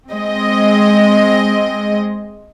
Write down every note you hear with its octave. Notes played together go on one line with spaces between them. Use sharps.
G#3 C4 D#5